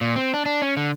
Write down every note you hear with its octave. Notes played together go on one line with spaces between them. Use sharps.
A#2
C4
D4
D4
C#4
D3